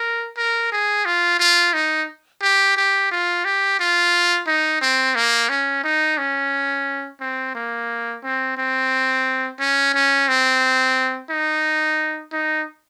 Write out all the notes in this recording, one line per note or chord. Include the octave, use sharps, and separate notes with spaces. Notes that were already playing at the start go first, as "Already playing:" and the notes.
Already playing: A#4
A#4
G#4
F4
F4
D#4
G4
G4
F4
G4
F4
D#4
C4
A#3
C#4
D#4
C#4
C4
A#3
C4
C4
C#4
C#4
C4
D#4
D#4